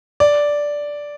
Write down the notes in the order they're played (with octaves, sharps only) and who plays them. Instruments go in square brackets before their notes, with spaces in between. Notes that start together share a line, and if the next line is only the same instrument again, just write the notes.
[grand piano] D5